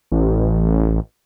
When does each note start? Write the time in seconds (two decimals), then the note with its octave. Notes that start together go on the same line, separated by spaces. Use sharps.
0.12 A1